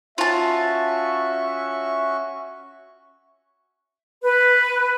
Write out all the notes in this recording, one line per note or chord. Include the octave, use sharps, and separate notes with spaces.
C#4 F4 F#4 E5 A5 C#6
B4